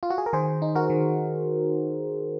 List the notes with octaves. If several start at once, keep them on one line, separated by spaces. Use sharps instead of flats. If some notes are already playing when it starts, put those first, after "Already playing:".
F4
F#4
G#4
A#4
D#3 G#4 C5
D#4
F#4 A#4
D#3